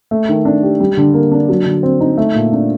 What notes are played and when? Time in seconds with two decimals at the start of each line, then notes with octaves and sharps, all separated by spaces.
0.11 A3
0.29 D#3
0.45 D4
0.63 G4
0.80 G3
0.97 D3
1.14 A#3
1.32 D4
1.49 F#3
1.66 D3
1.83 C4
2.00 D#4
2.18 A3
2.35 A#2
2.53 D4